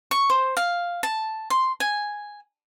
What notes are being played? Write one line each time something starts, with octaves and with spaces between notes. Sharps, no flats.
C#6
C5
F5
A5
C6
G#5